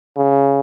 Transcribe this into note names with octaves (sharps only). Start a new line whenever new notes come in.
C#3